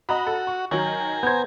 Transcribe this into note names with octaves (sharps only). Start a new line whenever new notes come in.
F#4 D#5 A#5 B5
A4
C#6
D#3 F#3 C#5 G#5 A#5
B3 C5 G6 G#6